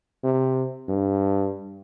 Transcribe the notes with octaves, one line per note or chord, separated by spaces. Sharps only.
C3
G2